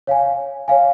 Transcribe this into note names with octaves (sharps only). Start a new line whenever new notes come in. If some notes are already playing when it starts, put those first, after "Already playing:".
C#5 F5 G#5
C#5 F5 G#5